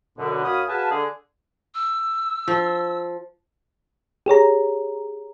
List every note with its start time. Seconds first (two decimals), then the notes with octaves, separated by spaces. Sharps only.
0.18 F#2 B2 D3
0.44 F#2 F#4 C#5 F5 B5 D#6
0.69 F#4 G#4 B4 F5 G#5 A5
0.91 D3 G#4
1.74 E6
2.48 F3
4.26 G4 G#4 C#5 A#5